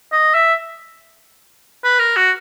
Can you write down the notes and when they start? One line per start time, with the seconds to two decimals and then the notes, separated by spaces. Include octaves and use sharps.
0.12 D#5
0.34 E5
1.84 B4
1.99 A#4
2.16 F#4